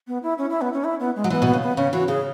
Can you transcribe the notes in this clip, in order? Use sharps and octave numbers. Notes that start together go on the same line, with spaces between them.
B3
E4
C#4
E4
B3
C#4
E4
B3
G#3
F#3
E3 B3
B2 B3
C#3
B3
C#3 C#4
E3 F#4
C#3 G#4